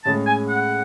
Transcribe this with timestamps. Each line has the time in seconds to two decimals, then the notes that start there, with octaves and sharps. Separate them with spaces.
0.04 A2 G#3 C#4 G#4 A5
0.26 G#5
0.48 F#5